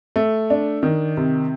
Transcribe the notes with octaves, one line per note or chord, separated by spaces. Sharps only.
A3
D4
D#3
C3